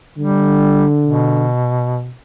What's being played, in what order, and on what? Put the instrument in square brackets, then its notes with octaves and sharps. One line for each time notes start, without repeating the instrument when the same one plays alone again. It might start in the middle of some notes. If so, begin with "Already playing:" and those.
[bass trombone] D3 [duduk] G3
[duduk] B2